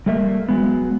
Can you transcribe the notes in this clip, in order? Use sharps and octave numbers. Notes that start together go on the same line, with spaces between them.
G3 A3 A#3 E5
F#3 G#3 B3